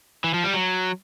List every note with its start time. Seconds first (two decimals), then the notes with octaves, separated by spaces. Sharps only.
0.24 E3
0.34 F3
0.44 G3
0.54 F#3